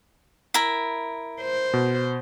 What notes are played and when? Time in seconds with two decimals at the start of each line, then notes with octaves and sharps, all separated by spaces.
0.54 E4 A#4
1.41 C5
1.73 B2